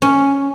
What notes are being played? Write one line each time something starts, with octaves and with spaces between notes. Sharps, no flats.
C#4